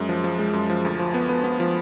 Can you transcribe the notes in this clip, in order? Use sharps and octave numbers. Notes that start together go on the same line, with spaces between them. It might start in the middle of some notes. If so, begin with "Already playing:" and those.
Already playing: F#2 G#3
F3
F3
G#3
F#2
F3
D2
F3
B3
B3
B3
F3